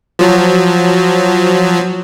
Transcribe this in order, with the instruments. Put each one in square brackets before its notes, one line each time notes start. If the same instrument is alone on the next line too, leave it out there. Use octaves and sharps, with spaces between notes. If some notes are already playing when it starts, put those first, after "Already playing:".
[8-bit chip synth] F3 F#3